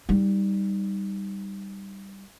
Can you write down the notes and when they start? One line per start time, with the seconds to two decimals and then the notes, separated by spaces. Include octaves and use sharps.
0.09 G3 D#4